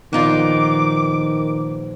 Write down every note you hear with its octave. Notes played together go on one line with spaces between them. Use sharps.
A#1 D#3 B3 D#4 F4 D6